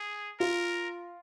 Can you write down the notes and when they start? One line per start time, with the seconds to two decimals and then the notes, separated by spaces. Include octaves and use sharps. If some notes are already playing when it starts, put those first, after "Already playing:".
Already playing: G#4
0.40 F4 A#4